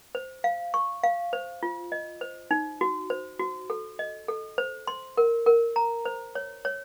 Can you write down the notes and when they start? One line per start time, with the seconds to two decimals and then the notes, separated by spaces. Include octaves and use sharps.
0.15 C5
0.44 F5
0.74 C#6
1.03 F5
1.33 C5
1.63 F4
1.92 D#5
2.21 C5
2.51 D#4
2.81 F#4
3.10 C5
3.40 F#4
3.70 A4
3.99 D#5
4.28 A4
4.58 C5
4.87 C6
5.17 A#4
5.46 A#4
5.76 A#5
6.05 C5
6.35 C#5
6.65 C#5